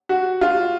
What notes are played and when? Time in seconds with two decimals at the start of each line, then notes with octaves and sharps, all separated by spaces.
0.09 F#4
0.41 F4